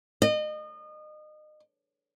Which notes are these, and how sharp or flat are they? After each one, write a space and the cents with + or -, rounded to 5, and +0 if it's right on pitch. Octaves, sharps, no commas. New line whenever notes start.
D#5 -30